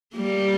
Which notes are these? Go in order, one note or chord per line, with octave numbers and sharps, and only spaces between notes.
G3 A#3